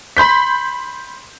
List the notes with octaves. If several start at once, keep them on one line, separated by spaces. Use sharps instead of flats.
B5 C6 G6 B6